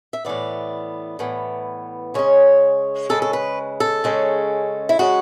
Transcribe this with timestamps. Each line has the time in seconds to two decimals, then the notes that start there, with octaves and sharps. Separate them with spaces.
0.13 E5
0.25 A2 E3 B3 D5
1.19 A2 E3 B3
2.14 C#3 G#3 C#4 C#5
3.09 C#3 G#3 C#4 A4
3.22 A4
3.33 B4
3.80 A4
4.04 C#3 G#3 C#4
4.89 E4
4.99 C#3 G#3 C#4 F#4